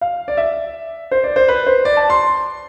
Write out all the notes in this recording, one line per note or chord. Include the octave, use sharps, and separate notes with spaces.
F5
D5
E5
C5
D5
C5
B4
C5
D5
A5
C6